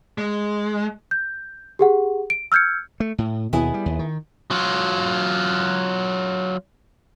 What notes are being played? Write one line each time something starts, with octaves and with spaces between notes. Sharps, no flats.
G#3
G6
G4 G#4 F#5
D7
E6 F6 G6 G#6 C#7
A3
A2
D#2 B2 B3 E4 G#4
G3
D#2
D#3
F#3 F4